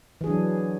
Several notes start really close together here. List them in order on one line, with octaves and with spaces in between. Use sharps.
E3 G#4 D4 F#3